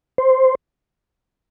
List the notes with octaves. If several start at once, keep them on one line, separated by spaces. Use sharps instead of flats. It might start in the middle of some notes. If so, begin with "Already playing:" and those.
C5